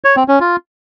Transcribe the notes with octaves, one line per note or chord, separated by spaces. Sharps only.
C#5
C4
C#4
F4